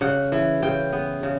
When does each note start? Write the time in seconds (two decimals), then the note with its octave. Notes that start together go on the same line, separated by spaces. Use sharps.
0.01 C#3 F#5
0.32 E3
0.62 C#3 G5
0.93 B3
1.23 C#3